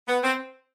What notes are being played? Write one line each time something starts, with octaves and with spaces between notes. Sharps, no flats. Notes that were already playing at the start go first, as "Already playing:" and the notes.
B3
C4